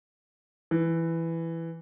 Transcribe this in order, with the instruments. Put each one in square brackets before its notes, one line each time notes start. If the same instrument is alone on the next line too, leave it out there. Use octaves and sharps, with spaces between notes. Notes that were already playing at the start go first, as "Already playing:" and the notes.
[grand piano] E3